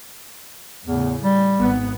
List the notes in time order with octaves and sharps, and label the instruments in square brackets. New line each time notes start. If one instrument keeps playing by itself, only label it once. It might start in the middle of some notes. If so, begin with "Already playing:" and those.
[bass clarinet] E2 [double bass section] A2 C#3
[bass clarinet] G3
[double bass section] G#1 G#2 B3